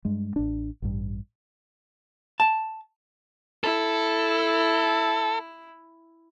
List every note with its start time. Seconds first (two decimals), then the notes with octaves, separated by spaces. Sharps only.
0.05 G2 G#3
0.36 A1 D4
0.82 A1 G2
2.40 A5
3.64 E4 A4